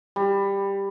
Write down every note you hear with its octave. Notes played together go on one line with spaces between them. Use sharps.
G3